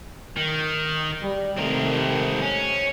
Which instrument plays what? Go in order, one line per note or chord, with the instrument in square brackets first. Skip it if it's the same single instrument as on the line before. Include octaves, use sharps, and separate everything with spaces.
[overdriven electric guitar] D#3
[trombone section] G3
[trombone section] C3 D#3 A3 [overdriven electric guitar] C4 A#4
[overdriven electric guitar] C#4